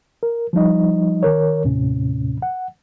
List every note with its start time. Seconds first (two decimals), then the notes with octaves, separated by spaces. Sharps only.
0.23 A#4
0.53 F3 G3 D#4 D#5
1.23 D#3 A#4 C#5
1.64 D#2 A2 C3 C#4
2.42 F#5